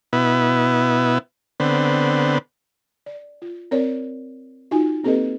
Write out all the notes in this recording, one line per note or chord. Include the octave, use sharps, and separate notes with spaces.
B2 B3 E4
D3 B3 C4
D5
F4
C4 A#4 C#5 D5
D#4 F4 F#4 G#5
A#3 C4 G4 A4 B4 D#5